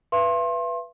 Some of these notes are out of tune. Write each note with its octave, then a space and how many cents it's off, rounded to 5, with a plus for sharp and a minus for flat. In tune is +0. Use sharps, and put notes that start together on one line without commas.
B4 -5 E5 +45 C6 +30